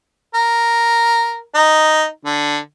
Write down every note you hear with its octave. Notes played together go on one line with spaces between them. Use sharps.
A#4
D#4
D3